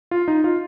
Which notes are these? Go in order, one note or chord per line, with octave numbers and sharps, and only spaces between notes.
F4
D#4
F4